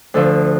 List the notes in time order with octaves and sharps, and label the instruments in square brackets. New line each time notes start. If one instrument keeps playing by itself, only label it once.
[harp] D2 D3 F3 A4